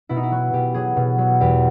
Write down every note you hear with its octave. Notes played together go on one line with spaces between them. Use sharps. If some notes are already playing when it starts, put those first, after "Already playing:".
B2 E4
D#4
E4
F#3 F#4
B2 G4
F#3 G#4
B2
F#3
E2 G4